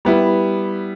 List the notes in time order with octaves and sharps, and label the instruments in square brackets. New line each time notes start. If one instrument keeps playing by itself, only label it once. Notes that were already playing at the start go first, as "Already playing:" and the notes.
[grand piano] G3 B3 E4